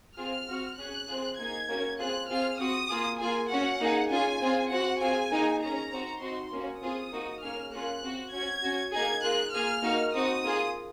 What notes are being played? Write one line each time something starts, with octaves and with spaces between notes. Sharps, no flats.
C4 F4 G#4 F6
C4 F#4
C#4 G#4 F#6
C4 F4 G#4
A#3 D#4 G#4 G#6
A#3 C#4 F#4
C4 F4 G#4 F#6
C4 F4 G#4 F6
C4 F#4 D#6
A#3 F4 G#4
A#3 F4 G#4 G#5
C#4 F#4 F#5
A#3 D#4 G#4
C#4 F4 G#4 G#5
C4 F4 G#4
C4 F#4 F#5
C4 F4 G#4 G#5
A#3 D#4 G#4
C#4 G#4 A#5
C4 D#4 F#4
C4 D#4 F#4 C6
A#3 C#4 F#4
C4 F4 G#4 D#6
A#3 D#4 F#4
A#3 C#4 G#4 F6
A#3 C#4 F4 G#4 F#6
C4 F#4
C#4 F#4 G#6
C#4 F#4
A#3 D#4 G#4 G#6
A#3 F4 G#4 F#6
A#3 F4 G#4 F6
A#3 D#4 F#4
C4 D#4 F#4 D#6
A#3 F4 G#4